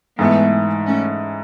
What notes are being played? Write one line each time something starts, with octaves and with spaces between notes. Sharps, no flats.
G#2 E3 G#3 A3 B3
A3 C#4